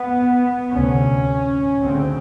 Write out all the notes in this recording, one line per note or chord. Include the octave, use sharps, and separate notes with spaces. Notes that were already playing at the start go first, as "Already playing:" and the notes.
Already playing: B3
D2 C3 C#4
D2 C#3 C4